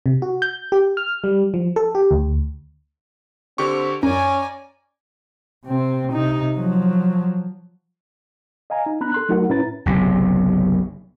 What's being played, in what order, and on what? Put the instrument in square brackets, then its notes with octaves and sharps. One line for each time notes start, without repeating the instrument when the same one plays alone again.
[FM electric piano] C3
F#4
G6
G4
F6
G3
F3
A4
G4
D2
[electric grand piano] D3 G4 C#6 [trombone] C4
[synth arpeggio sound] F#2 [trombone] C#4 [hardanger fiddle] D5 G#5 [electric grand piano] A#5
[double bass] C3 C4
C3 D#4
F3 F#3
[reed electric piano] D#5 F5 G#5 A#5
D#4
B3 D4 A#5 B5 F#6
A4 C6 F#6
F#3 A3 D#4 F#4 A#4 F#5
A2 C#4 E4 B4 A#5 A6
[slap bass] F#1 B1 C3